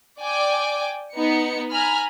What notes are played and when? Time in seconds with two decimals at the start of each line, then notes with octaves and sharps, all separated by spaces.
0.20 D5 G5 G#5 D6
1.14 B3 D#4 C#7
1.71 G#5 A#5 B5 F6